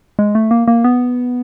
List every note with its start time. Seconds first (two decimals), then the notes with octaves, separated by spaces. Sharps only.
0.19 G#3
0.35 A3
0.51 A#3
0.68 A#3
0.84 B3